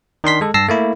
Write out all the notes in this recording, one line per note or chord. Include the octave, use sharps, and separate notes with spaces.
D#3 D4 C6 B6
G#3 A4
G2 A5 E6 A#6 C7
A3 A#3 E4